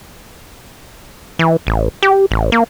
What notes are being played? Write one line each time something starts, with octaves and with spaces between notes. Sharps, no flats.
E3
A1
G4
A1
A#3